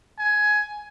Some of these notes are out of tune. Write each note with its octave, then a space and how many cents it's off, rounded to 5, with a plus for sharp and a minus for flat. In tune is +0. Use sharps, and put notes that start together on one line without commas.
G#5 +15